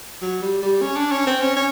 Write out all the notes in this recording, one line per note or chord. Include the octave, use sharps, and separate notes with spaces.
F#3
G3
G3
C#4
D4
C#4
C4
C#4
C#4